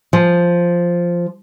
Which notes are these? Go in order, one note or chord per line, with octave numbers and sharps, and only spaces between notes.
F3